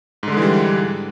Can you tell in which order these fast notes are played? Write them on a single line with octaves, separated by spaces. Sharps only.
G#2 D3 G#3 E3 G3